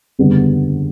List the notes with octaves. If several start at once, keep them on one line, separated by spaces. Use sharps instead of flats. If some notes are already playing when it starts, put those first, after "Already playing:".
F#1 E2 D3 G3 B3